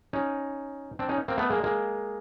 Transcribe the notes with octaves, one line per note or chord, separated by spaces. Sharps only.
C#4 D#4
C4 D4
C#4 D#4
A#3 C4
A3 B3
G#3 A#3
G#3 A#3